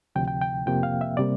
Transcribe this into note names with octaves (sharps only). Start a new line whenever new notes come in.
D2 C3 F3 G5
G5
G5
F2 C3 F3 A#3 G5
F5
E5
C3 G3 A#3 D5